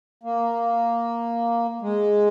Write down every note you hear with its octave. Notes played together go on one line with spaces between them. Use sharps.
A#3
G#3